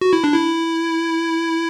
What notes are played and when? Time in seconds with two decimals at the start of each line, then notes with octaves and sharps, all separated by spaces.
0.01 F#4
0.13 E4
0.24 D4
0.34 E4